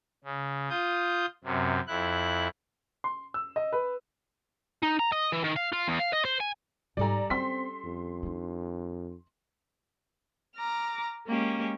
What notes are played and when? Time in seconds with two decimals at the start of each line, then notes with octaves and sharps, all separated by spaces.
0.24 C#3
0.70 F4 D#6 G6
1.44 F#2 C3
1.87 F2 E4 F#6
3.04 C6
3.34 E6
3.56 D#5
3.73 B4
4.83 D#4
4.99 A#5
5.12 D#5
5.32 E3
5.44 D#3
5.56 F5
5.72 F4
5.88 E2
5.99 F5
6.13 D#5
6.25 C5
6.40 G#5
6.97 G#2 G3 A4 D5 G#5 A#5
7.30 C4 C#4 C6 B6
7.84 F2
8.23 D4 D#4
10.57 A#5 D6 F6
11.27 G#3 A#3 C#4 G4